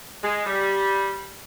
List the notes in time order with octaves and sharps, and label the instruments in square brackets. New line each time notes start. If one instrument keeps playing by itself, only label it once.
[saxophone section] G#3
G3